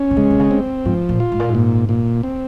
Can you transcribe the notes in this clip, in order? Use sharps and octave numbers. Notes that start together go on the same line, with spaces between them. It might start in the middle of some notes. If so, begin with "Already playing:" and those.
Already playing: C#4
C3
C#3 G#3
C3
C#3
C4
G#2 F3
A#2
F4
G#2
A#2
G#2
A#2
A#2
C4